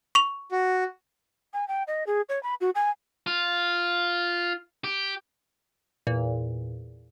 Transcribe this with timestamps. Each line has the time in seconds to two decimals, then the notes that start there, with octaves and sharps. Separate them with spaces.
0.15 C#6 F7
0.52 F#4
1.53 G#5
1.68 G5
1.87 D#5
2.07 G#4
2.29 C#5
2.43 B5
2.61 F#4
2.75 G#5
3.27 F4
4.84 G4
6.07 E2 A#2